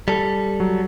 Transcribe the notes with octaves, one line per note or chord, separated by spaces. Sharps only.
G3 A4
F#3